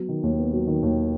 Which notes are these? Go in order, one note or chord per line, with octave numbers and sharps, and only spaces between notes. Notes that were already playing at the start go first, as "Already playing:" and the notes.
Already playing: F#3 B3
D#3
D#2
B3
F#3
D#3
D#2